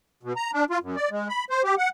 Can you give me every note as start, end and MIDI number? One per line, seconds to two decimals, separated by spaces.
0.23 0.33 47
0.37 0.51 82
0.53 0.65 62
0.70 0.78 65
0.82 0.96 42
0.96 1.09 74
1.11 1.28 56
1.29 1.45 83
1.50 1.62 72
1.64 1.75 67
1.78 1.89 78